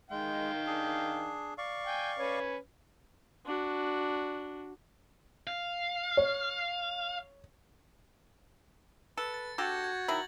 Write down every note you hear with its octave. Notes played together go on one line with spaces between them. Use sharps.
D#3 G#3 F5 G5
D4 G#4
D5 F5 C#6
G5 G#5
C#4 B4 C#5
D4 F#4
F5
C#5
A4 B4 A6 C#7
A6
D4 F#4 G4 A4 G6 G#6 A#6
G#6
D#3 F#3 E4 F#7